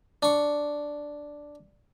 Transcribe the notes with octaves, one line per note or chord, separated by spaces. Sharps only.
D4 C#6